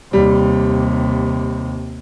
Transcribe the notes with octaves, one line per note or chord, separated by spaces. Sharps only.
D#2 C3 G3